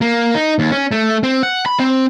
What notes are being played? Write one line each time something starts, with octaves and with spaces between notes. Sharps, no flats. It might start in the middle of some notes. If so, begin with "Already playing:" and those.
A#3
D#4
D#2
C#4
A3
C4
F#5
B5
C4